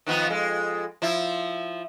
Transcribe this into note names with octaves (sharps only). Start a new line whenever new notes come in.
D#3 F3 B3
F2 G#3
F3 E4